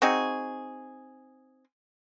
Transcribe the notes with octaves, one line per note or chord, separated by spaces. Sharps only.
C4 D#4 F#4 G#4